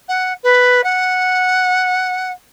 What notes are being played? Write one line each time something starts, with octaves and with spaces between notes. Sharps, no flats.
F#5
B4
F#5